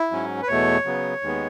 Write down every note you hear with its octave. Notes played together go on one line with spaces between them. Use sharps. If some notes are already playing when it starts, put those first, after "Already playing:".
Already playing: E4
G#2 F#3 C#4
B4
E2 B2 A3 C#5
C#3 F#3 B3
D#2 D#3 G#3 B3